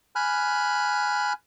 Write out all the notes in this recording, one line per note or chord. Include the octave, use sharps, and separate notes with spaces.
G#5 B5 F6 F#6